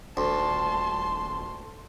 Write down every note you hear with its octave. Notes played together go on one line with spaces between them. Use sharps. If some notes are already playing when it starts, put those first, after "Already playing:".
D#1 D2 A5 C6